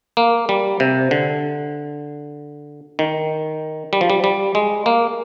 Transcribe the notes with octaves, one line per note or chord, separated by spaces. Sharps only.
A#3
G3
C3
D3
D#3
G3
F3
G3
G3
G#3
A#3